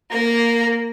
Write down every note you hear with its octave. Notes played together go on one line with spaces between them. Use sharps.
A#3 A#5